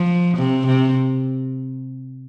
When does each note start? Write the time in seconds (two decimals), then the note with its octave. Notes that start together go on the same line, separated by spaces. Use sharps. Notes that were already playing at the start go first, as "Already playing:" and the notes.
Already playing: F3
0.37 C3
0.66 C3